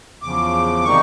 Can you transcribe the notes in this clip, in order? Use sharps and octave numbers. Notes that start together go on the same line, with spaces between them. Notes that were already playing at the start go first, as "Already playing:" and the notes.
E2 C#3 F3 D6
C3 D#3 G3 A#3 D#4 C#6